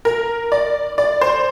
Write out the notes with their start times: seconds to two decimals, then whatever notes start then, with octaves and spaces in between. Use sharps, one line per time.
0.05 A#4
0.52 D5
0.98 D5
1.21 C5